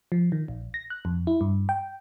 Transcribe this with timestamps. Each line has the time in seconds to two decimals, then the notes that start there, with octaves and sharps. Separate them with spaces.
0.12 F3
0.32 D#3
0.48 A#1
0.74 A#6
0.90 F#6
1.05 F2
1.27 E4
1.41 G2
1.69 G5